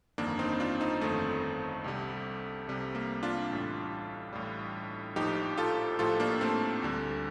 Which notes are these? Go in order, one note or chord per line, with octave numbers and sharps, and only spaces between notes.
G1 F2 D#3 A#3 D4
C4 D#4
D4 F4
C4 D#4
G1 F2 D#3 A3
C2 C3 G3
C2 C3 G3
A#3
D4 F4
A1 A2 G3
A1 A2 G3
A#1 A2 F3 D#4 G4
F4 A4
A#1 A2 F3 F4 A4
A#3 D4
A3 C4
D2 D3 G3